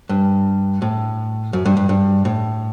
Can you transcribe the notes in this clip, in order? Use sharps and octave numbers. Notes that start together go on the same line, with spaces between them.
G2
A2
F#2
G2
G2
G2
A2